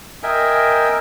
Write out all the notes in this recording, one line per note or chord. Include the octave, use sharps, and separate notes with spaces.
A#4 D#5 E5 G5 G#5